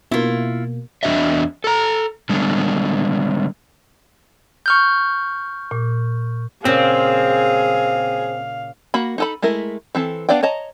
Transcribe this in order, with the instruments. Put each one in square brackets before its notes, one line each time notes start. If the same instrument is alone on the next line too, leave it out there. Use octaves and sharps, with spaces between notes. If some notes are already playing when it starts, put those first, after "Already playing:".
[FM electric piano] B2 A#3 [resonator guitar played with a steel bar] E4 F4
[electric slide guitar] E2 D#3 D4 F#4 D#5 E5
A4 A#5
D3 G3 G#3 B3
[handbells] C#6 F6 G6
[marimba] A#2
[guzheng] A#2 C#3 [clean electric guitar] C4 [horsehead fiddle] G#4 [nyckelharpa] F5
[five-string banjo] A#3 F#4 B5
D#4 A4 B5
G#3 A3 E4 A#4
E3 C4 A4
B3 D4 D5 F5 G5
C#5 D#5 A5 A#5